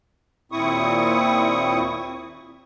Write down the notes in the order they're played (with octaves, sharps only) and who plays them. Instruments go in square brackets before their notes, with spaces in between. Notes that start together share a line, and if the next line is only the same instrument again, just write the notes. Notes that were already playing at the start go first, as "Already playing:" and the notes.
[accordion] D#2 A#2 C4 E4 C#6 D#6